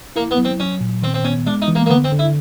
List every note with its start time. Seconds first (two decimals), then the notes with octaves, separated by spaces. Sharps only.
0.16 A#3 E4
0.31 B3
0.38 F#3
0.45 C4
0.60 F#3 C#4
0.81 A#2
1.02 D#3 C4
1.14 C4
1.25 B3 C#4
1.47 G#3 D4
1.62 D#4
1.68 E3
1.75 A#3
1.86 A#3
1.90 D3 B3
2.04 C4
2.12 D3
2.19 E4